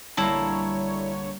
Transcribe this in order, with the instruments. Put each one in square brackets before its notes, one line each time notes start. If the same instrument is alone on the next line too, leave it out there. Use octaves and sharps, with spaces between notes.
[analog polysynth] A#1 D3 C#5 [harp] G3 A#3 [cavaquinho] E4 A5